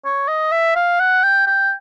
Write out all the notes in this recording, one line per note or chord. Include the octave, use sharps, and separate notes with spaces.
C#5
D#5
E5
F5
F#5
G5
G5